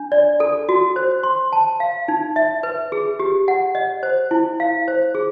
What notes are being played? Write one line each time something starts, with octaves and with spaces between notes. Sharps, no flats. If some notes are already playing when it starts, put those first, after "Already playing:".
Already playing: D4
D5
A4
F#4
C5
C6
A5
F5
D#4
E5
B4
G#4
G4
F#5
D#5
C5
E4
F5
C5
G#4